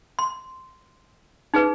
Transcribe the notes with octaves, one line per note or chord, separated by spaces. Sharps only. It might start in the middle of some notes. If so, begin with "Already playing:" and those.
C6
D#4 G#4 B4